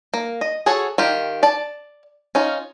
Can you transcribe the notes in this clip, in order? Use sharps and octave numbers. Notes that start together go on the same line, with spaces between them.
A#3
D#5
F#4 G#4 A4 C#5
D#3 F4 G4
D5 A5
C#4 D#4 F4